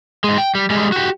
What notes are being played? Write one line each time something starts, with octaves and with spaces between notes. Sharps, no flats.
G#2 G#3
G5
G3
G3 G#3
F#4 G4